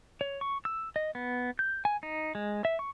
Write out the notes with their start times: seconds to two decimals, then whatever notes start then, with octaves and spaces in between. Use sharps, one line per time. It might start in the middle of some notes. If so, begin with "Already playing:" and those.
0.21 C#5
0.41 C#6
0.65 E6
0.96 D#5
1.15 B3
1.59 G6
1.85 G#5
2.03 D#4
2.35 G#3
2.65 E5
2.79 C#6